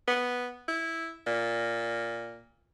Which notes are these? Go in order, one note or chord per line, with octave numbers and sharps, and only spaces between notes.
B3
E4
A#2